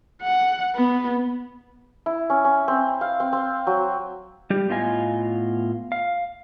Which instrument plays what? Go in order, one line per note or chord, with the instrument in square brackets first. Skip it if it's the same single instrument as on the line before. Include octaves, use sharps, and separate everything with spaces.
[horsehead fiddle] F#5
B3
[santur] E4
C#4
C#4
C4
F5
C4
C4
F#3
[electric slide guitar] G3 G4
A2 B3 F4 D#5 G#5
F5